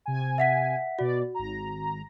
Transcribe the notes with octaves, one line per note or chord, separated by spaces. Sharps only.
C3 G#5
E5 F#5 B6
B2 F#4 D5
G#1 A#5